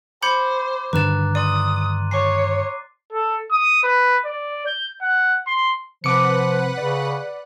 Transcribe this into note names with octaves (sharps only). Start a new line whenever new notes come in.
C5 B5 D6 G6 G#6 C#7
G2 D3 D#3 B4 A#5 F#6 A6 E7
D5 C6 D#6 D#7
C#5 D6 C7
A4
D#6
B4
D5
G6
F#5
C6
C3 F3 B4 F#5 D6 F#6 C#7
C#3 D5